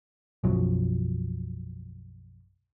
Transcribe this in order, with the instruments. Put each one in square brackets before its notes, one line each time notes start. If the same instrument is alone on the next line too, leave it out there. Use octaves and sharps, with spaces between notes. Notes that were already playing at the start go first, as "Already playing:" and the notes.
[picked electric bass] B1 F#2 F3 F#3